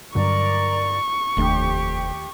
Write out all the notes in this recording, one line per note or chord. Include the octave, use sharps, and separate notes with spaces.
G2 D3 F#3 A#4 D5 A#5 C#6
F1 D#2 A3 D4 G4